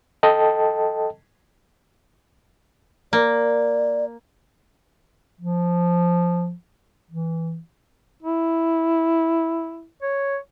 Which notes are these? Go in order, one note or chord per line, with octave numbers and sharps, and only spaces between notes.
A4 D#5 G5 A5
A#3 D5
F3
E3
E4
C#5